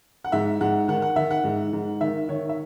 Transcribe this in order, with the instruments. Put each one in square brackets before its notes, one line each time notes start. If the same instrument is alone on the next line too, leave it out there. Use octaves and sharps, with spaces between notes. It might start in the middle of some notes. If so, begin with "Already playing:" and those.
[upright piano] F#5
G#2 E5
G#2 F#5
D#3 F#5
F#5
D#3 E5
F#5
G#2
G#2
D#3 E5
D#3 C#5
E5